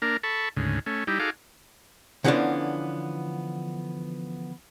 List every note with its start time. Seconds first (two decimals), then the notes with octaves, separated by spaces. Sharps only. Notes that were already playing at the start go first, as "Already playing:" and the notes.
0.02 A#3 D4 A#4
0.23 A4 A5 B5 C#6
0.57 D2 G#2 C#3
0.86 A3 C#4
1.07 G3 D#4 E4 G4
1.19 D#4 F#4 G#4 A4 F5 D6
2.24 D3 E3 F3 B3 C#4 D4